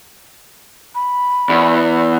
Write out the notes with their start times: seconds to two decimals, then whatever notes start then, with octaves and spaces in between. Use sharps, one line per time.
0.95 B5
1.49 E2